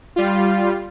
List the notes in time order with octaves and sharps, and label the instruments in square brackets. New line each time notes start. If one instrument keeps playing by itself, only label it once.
[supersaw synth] G3 F4